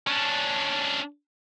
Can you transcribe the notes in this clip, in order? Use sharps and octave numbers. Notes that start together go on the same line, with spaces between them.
C#4 D4